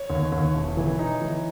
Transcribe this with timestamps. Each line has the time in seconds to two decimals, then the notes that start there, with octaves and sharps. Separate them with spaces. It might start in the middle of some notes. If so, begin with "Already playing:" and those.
Already playing: C#5
0.10 D#2
0.32 D#2
0.55 E1
0.77 E3
0.99 D#4
1.22 E3